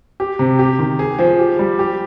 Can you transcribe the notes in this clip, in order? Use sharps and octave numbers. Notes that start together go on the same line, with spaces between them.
G4
C3
G4
D#3
G#4
F3
G4
G3
G4